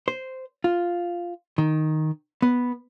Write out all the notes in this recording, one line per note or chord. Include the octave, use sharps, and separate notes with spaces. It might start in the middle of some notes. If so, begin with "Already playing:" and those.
C5
F4
D#3
B3